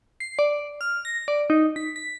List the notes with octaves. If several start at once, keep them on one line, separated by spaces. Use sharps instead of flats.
C7
D5
F6
A#6
D5
D#4
B6
B6